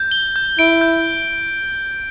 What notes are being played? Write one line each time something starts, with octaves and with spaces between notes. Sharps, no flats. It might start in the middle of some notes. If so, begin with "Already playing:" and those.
Already playing: G6
G7
G6
E4 D7
G6